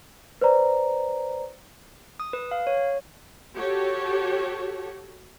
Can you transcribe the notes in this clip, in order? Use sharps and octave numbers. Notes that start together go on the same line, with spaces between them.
B4 C5 D5 A#5
D#6
B4
F5
C#5
F#4 G4 A4 C#5